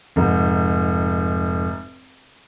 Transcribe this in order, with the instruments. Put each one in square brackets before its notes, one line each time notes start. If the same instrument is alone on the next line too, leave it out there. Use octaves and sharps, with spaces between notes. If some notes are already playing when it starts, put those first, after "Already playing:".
[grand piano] F1 G#2